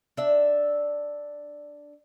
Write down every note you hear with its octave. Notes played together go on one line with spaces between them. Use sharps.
D4 E5